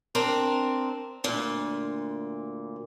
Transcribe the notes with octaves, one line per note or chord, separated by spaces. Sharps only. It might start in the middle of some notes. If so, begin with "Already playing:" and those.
C4 D4 A#4
D2 A#2